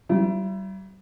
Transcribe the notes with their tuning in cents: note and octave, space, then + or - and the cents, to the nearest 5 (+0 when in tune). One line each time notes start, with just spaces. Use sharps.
G3 -35 E4 +30